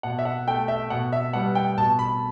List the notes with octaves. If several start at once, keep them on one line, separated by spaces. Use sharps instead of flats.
B2 F#5
E5
F#5
A3 G5
E5
B2 F#5
E5
G3 B3 F#5
G5
B2 A5
B5